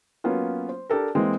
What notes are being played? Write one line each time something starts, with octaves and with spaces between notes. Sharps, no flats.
F#3 A#3 B3 C#4 F4
C5
D4 G4 A4 A#4
E3 G#3 A#3 C4